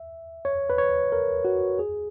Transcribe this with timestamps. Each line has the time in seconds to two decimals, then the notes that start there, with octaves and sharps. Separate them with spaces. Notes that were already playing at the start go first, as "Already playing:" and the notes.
Already playing: E5
0.45 C#5
0.70 B4
0.78 C#5
1.12 A#4
1.45 F#4
1.79 G#4